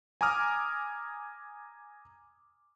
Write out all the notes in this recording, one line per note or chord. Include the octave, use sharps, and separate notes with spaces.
G#5 A#5 D6 D#6 F6